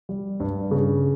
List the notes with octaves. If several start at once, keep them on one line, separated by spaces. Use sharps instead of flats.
G3
G2
C#3